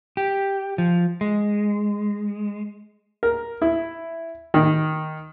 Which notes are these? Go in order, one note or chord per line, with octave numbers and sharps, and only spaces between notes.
G4
F3
G#3
A#4
E4
D#3